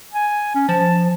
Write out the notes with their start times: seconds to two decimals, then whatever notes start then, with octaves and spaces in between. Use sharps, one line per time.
0.13 G#5
0.56 C#4
0.69 F3 A5